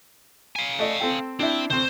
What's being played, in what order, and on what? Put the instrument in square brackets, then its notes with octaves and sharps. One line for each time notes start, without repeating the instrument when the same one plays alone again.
[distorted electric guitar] F5 G#5
[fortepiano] A3 D5 D#5
C4 A4 G5
[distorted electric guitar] C4 [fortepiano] D4 E4
[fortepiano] D2 C4 [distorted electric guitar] C5